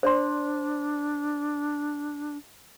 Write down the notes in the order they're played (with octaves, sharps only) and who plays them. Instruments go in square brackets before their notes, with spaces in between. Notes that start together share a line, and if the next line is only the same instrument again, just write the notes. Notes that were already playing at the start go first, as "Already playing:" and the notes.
[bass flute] D4 [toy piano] C5 D5 C6